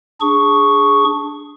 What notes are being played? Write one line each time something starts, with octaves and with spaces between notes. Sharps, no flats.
D4 G#4 C#6